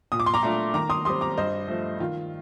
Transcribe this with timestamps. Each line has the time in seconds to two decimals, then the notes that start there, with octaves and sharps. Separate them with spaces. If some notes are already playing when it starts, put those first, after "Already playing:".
0.12 A#2 D#6
0.20 D6
0.26 C6
0.34 A#5 D6
0.43 A3 D4 F4
0.74 D#3 A#5 D6
0.90 C6 D#6
1.05 G3 C4 C6 D#6
1.21 A#5 D6
1.37 G2 C5 D#5
1.68 F3 A3
2.00 D#3 F4